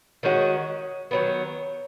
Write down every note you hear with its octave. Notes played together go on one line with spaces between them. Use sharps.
D#3 G#3 C#4 F#4
D#3 F#3 B3